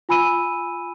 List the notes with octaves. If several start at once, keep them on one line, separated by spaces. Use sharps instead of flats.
F4 G#5 B5 E6 D#7